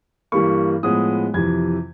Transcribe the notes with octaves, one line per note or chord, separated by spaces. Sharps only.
G2 E3 G3 A#3 C#6
A2 F3 G#3 B3 D#6
F2 C3 E3 G#6